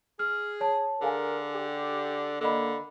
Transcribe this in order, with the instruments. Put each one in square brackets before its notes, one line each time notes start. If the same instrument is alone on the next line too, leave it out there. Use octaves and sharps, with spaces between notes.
[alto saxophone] G#4 [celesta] F6
[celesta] C#5 A5
[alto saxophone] D3 [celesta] G#4 F5 G#5 [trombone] A#4
[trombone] G4
[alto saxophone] D3 [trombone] A#3 [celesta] A4 D#5 B5